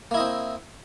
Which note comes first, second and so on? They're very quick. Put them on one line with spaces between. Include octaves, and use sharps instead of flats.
A#3 E4 D#5 C4